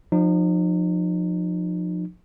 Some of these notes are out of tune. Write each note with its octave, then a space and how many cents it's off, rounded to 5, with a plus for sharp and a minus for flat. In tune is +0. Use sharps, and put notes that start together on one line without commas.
F3 +25 D#4 -35